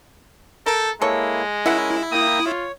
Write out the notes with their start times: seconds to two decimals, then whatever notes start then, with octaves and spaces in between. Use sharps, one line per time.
0.66 A4 A#4 G6
1.02 G#3 A#3 E4 A4 C#5
1.66 C#4 E4 A#4 E5 F#5
2.12 A#3 G5 A#5 D#6
2.47 F4 C#5